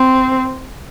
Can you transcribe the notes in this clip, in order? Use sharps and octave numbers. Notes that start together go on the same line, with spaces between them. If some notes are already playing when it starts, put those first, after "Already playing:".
Already playing: C4